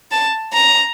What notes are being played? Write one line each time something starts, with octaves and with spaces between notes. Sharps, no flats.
A5
A#5